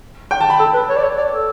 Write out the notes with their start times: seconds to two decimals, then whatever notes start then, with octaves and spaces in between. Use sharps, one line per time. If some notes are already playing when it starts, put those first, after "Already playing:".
0.31 G5
0.41 A5
0.50 B5
0.59 A4 A5
0.74 B4
0.89 C#5
0.97 D5
1.03 C#5
1.18 D5
1.32 A4